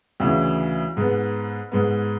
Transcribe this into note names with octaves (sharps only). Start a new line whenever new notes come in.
D2 C#3 E3
G#2 G#3 B3
G#2 G#3 B3